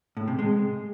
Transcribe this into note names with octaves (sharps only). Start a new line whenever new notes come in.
A2
C3
G#3